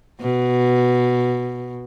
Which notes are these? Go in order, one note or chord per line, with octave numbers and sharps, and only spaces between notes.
B2